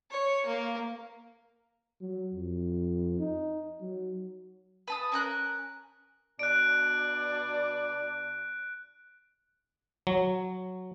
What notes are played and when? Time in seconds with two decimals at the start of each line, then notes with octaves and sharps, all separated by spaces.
0.11 C#5
0.46 A#3
2.01 F#3
2.34 F2
3.19 D#4
3.80 F#3
4.87 B4 A5 D#6
5.12 C#4 A#4 F#6
6.39 B2 D4 D5 F#6 D7
10.07 F#3